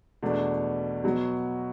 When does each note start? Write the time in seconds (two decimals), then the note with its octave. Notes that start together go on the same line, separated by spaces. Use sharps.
0.23 E2 B2 A3 D4
1.04 B2 F#3